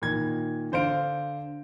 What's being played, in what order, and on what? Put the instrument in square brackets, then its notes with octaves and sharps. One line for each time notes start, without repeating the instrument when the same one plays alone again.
[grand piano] A#2 D#3 G#6
D3 C5 F5 D7